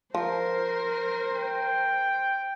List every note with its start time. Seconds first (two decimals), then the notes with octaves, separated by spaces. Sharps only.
0.15 F3 A#4 C5
1.35 G5